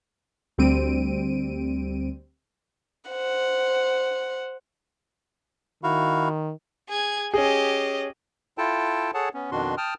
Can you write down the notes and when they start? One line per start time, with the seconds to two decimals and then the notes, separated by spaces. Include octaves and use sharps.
0.58 D2 G3 C4 D7 D#7
3.11 C5 F#5
5.83 D#3 E4 F#4 F5
6.89 G#4 G#6
7.34 C#4 G4 G#4 D#5
8.58 E4 F4 A4 G5 A5
9.14 G#4 A4 C#5 F#5 A5
9.34 B3 C#4
9.51 F2 B2 D#3 D4 F#4 C6
9.77 G5 A5 D#6 F6